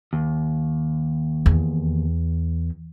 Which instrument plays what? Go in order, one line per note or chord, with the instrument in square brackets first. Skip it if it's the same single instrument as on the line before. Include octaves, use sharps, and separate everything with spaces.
[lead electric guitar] D#2
[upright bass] E2